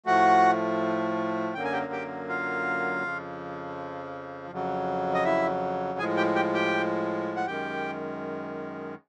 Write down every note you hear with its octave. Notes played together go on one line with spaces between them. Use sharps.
A2 F3 A3 F#4 F#5
F#2 D3 F#3 A#3 G5
G#5
G4 G5
G4 G5
F4 F5
F2 C#3 F3
F2 C#3 F#3
D#5
E4 E5
A2 F3 G#3 G#4 G#5
G4 G5
G4 G5
G4 G5
F#5
F#2 D#3 G#3 G4 G5